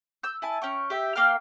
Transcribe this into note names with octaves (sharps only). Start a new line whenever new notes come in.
E6 G6
E4 G#5 A5
C#4 G5 C#6
G4 E5 G5
A#3 F5 G5 F6